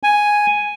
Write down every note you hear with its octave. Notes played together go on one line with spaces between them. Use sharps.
G#5